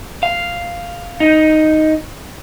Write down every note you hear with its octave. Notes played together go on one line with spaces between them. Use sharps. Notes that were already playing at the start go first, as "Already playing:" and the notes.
F5
D#4